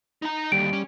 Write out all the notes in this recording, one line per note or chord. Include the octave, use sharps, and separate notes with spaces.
D#4 A#5
D#2 D3 G3 D7
C#4